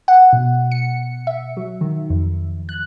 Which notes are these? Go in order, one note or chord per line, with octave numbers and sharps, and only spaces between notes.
F#5
B2
C#7
E5
F#3
D#3
F2
F#6